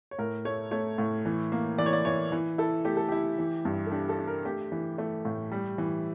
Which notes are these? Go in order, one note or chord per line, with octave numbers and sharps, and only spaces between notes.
C#5
A2 A#4
A3 C#5
A3 C#5
A2
E3
A#3
E3 D5
C#5
D5
E3 C#5
E3
E4 A4
A3 G4
A4
E4 G4
E3
G2
A4
D4 G4
A4
D4
A#4
A3 G4
E3
A3
A2
G3
E3